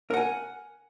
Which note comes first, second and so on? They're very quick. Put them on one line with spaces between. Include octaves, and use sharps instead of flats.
A#4 F#5 G#5